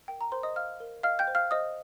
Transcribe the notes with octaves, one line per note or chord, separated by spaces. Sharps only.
A#4 G5
A#5
A#4 C5 C6
D#5 D#6
F5 F6
A#4
D#5 F5 F6
G5 G6
C5
F5 F6
C5 D#5 D#6